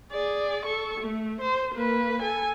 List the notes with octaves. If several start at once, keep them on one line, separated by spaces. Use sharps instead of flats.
G#4 D5
A4 C#6
A3
C5
A#3 B4
A4 G#5